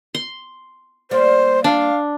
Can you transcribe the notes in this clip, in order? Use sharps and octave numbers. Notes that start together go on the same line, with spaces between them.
C6
G3 A#3 C5
D4 F5